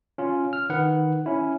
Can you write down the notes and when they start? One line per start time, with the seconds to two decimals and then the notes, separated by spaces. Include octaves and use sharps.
0.18 C#4 F4
0.53 F6
0.70 D#3 B4 F#5
1.26 C#4 E4